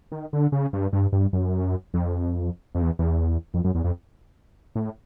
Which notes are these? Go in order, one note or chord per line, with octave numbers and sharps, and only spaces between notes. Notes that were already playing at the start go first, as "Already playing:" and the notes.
D#3
D3
C#3
G2
G2
G2
F#2
F2
F2
E2
E2
F2
F#2
E2
F2
A2